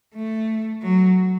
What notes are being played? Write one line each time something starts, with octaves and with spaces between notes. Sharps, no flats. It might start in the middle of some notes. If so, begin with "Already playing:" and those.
A3
F#3